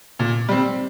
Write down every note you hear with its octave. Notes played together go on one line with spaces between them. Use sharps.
A#2
G3 C4